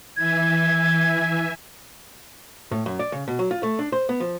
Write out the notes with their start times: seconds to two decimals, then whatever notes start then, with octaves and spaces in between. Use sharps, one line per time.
0.17 E3 E5 G#5 G#6
2.71 A2
2.86 F#2
2.99 D5
3.12 C#3
3.28 B2
3.39 F#3
3.51 F4
3.63 A3
3.79 D4
3.92 C5
4.09 B3
4.20 F3